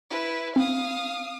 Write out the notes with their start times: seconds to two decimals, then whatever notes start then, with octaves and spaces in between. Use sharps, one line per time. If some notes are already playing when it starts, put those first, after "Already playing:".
0.10 E4 B4
0.56 C4 F5 D#6